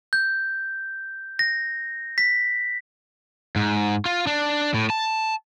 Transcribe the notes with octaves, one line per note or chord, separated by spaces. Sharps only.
G6
A#6
B6
G#2
F4
D4
A2
A5